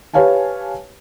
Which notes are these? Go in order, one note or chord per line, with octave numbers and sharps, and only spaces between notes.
G4 B4 C#5 F5 G#5 A5